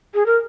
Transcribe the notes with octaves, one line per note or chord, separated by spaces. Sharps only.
G#4
A#4